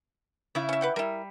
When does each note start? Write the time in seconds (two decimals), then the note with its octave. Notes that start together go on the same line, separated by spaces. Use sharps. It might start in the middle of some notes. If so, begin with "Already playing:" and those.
0.55 C#3 E4
0.69 C#4 E5
0.81 B4 F#5 G5
0.96 G3 E4 A#4